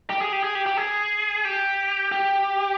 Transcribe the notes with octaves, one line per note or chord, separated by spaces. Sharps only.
G4
G#4
G4
G#4
G4
G4
G#4
G4
G4